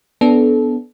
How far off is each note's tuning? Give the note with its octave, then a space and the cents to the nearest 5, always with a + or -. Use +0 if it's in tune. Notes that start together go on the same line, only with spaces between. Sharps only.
B3 +0 D4 -5 A4 -25